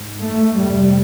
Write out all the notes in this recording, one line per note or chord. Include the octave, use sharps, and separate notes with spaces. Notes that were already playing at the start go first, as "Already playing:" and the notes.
Already playing: G#2
A3
F2 C3 G3